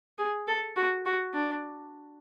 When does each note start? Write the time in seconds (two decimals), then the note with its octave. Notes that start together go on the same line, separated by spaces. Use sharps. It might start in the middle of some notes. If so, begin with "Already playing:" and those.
0.18 G#4
0.48 A4
0.76 F#4
1.06 F#4
1.34 D4